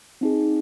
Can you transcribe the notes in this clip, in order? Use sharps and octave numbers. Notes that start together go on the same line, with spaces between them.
C4 D#4 G#4